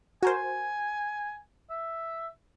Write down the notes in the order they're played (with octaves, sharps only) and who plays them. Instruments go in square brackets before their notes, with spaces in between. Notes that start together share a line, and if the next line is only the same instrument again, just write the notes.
[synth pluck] F#4 A#4 C5 [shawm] G#5
[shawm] E5